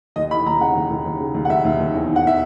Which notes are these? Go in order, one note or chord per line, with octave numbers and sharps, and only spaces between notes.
D#2 D#5
E3 B5
D#2 A#5
C#3 F#5
D#2
D#2
D#2
C#3
D#2
F#5
D#2 E5
D#2
D#2
E2
D#3
F#5
D#3 E5